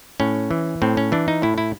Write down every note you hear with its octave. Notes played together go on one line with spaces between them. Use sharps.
A2 C#4
E3
A2 C4
C#4
E3 D4
D#4
A2 E4
E4